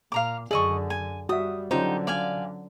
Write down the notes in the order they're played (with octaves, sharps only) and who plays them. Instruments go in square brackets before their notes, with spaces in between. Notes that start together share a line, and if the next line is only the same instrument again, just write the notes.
[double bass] A#2 [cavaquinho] F5 A#5 D6
[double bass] F#2 D3 [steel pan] G#4 E6 [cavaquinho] D5 D#5 C#6
[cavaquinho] G#5
[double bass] G3 [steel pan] F#4 E5 [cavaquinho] D#6
[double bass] D3 F#3 [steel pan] C#4 F4 C5 [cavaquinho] D#4 G4
[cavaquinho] D5 F5 G#5